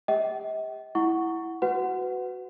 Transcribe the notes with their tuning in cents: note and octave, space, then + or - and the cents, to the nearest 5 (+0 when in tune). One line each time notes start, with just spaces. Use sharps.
G4 +35 D#5 +45 G5 -40
E4 +0 F#5 +0 C#6 +5
F#4 +0 B4 +20 F#5 +0